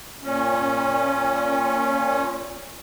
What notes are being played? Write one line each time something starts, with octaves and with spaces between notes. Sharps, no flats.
A#2 C#4